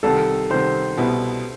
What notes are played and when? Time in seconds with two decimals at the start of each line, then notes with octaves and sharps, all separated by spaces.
0.03 C2 C3 D#3 A4
0.50 C2 C3 D#3 C5
0.97 C2 B2 G3 B3 E4